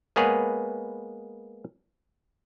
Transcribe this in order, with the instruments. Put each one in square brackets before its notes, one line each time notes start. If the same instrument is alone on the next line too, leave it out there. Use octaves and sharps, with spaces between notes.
[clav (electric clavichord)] G#3 A#3 B3 G#4 B4 C#5